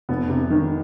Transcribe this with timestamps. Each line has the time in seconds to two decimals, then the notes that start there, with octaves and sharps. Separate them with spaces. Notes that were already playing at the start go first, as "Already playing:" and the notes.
0.09 F1 B3
0.30 C3
0.50 D#3